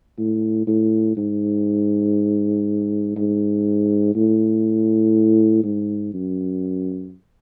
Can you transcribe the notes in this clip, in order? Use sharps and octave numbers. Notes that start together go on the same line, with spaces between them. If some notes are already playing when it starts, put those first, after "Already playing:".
A2
A2
G#2
G#2
A2
G#2
F#2